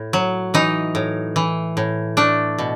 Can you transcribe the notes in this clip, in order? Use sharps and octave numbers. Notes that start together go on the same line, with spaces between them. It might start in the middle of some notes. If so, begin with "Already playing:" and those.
Already playing: A2
F#3
E3 D#4
A2
E3
A2
A3 D4
B2